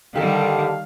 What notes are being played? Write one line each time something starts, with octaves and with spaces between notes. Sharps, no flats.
D3 D#3 G3 G4 A4 F5